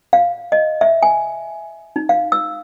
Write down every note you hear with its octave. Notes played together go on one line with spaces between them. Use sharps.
F5
D#5
E5
G#5
D#4
F5
E6